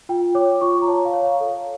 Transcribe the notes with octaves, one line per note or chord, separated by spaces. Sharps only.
F4 G5
C#5 D6
F4 C#6
A#5
C#5 A5
F5
C#5
F5
A4